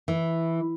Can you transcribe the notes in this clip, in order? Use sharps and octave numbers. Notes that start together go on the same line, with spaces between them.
E3